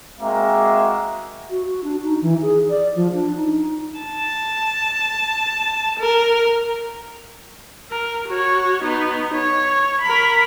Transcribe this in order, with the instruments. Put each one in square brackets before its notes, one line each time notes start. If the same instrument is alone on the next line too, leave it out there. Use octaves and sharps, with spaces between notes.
[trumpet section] G#3 A#3 C4 F#4 A#4 E5
[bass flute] F#4
F#4
D4
D#4
E3
G#4
D5
F3
D4
D#4
[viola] A5
A#4
A#4
F#4 C#5
B3 D#4
C#5
A#4 B5